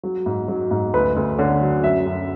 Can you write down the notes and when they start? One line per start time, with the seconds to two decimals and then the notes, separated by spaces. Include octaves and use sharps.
0.03 F#3
0.26 G#2
0.48 F#3
0.71 G#2
0.94 D2 B4
1.16 D2
1.38 D3 C#5
1.61 F#3
1.84 F#2 E5
2.06 F#2